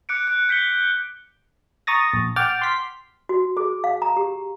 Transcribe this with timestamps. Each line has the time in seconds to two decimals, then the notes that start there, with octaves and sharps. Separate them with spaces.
0.09 D6 F#6 C#7 D7
0.27 F#6
0.49 G6 B6 C#7 G7
1.87 A#5 C#6 D#6 A6 A#6
2.13 A#1
2.36 F#5 G5 D6 F6 A6
2.62 C6 B6
3.29 F#4
3.57 G#4
3.84 F5
4.02 A#5
4.17 G4